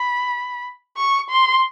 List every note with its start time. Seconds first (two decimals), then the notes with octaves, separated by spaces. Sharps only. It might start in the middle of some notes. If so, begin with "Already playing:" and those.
Already playing: B5
0.97 C#6
1.30 C6